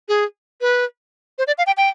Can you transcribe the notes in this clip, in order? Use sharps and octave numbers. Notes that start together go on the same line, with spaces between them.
G#4
B4
C5
D5
F5
G5
G5